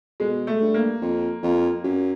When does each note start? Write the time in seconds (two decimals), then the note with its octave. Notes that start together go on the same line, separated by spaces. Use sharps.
0.20 B2 G#3
0.47 A3
0.61 G2
0.74 A#3
1.02 F2
1.43 F2
1.84 F#2